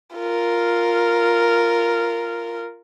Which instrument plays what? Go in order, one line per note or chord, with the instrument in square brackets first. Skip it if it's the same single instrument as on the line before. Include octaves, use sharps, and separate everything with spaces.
[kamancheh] F4 A#4